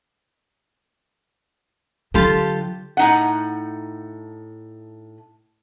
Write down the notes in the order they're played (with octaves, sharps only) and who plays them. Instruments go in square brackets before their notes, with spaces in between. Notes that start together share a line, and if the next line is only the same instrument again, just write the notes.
[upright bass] D3 F#3 [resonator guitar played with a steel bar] F4 G4 A4
[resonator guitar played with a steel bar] A2 D#4 F#5